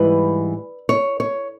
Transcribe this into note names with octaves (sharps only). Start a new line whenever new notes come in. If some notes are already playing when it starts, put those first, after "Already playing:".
Already playing: G#2 E3 G3 B4
C#5
C#5